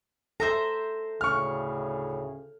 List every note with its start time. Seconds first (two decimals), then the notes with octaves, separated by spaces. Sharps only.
0.40 A4 C5 E5 A#5
1.21 D2 A2 C#3 C#6 F6